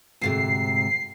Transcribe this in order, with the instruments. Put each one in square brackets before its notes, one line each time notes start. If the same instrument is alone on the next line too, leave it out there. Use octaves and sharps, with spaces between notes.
[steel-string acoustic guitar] D2 G#2 C3 [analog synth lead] C7